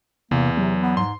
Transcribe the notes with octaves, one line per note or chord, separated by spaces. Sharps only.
E2 C3 A#3
C3 F#3
B3
G#2 C6